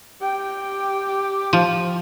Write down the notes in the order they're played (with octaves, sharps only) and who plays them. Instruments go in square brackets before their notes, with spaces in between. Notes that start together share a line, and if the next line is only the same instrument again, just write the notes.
[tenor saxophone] G4 [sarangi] G5
[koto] F3